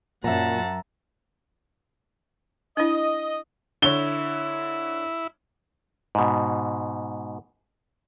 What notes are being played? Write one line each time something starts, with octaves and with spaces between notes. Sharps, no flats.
F#2 A#2 E5 F#5 A5 A#5
D4 E4 D#5
D3 E4 C#5 G7
G#2 B2